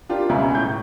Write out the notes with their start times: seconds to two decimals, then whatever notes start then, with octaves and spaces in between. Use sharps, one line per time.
0.09 D4 F4 G4 A#4
0.29 C#2 B2 E5 G#5 A#5
0.55 A2 G6